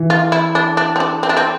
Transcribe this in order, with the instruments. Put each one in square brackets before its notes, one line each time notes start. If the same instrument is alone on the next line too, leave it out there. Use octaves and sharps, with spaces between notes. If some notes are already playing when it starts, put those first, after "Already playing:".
Already playing: [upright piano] E3
[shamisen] F4
E4
D4
D4
C4
D4
C4
D4
C4